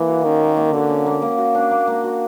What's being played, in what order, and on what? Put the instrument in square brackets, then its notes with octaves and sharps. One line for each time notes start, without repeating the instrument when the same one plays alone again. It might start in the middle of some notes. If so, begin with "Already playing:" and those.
Already playing: [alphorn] E3 [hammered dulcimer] A#3
[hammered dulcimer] F#4
[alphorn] D#3 [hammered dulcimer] C#4
[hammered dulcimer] A#3
A#3
[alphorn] D3 [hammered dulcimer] F#4
[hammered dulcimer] C#4
A#3
A#3
F#4
D4
A#3
A#3
F#4